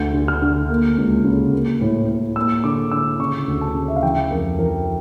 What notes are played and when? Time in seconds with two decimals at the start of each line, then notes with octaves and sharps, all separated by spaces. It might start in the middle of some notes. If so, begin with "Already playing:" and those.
Already playing: D2 G6
0.14 D3
0.28 F6
0.42 D3
0.69 A#3
0.98 C#2
1.25 C#3
1.53 A#3
1.81 A2
2.09 A2
2.36 A#3 E6
2.64 D3 D6
2.91 D3 E6
3.19 C#3 C#6
3.48 D2
3.61 A5
3.75 C#3
3.88 E5
3.96 F5
4.03 E3 G5
4.31 F2 A#4
4.58 E3 A#4